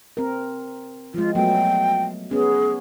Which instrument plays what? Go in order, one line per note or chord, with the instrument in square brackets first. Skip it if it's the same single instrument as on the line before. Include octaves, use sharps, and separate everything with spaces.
[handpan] C4 A#4
[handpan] F3 G#3 [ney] F4
[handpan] F#3 A3 B3 [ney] G5
[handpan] B3 C#4 [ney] G#4